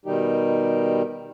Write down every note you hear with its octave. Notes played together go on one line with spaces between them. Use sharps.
B2 D#3 G3 D#4 G4